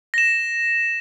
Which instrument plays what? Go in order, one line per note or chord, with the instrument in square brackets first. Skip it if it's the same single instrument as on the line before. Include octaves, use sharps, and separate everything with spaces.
[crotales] A#6 E7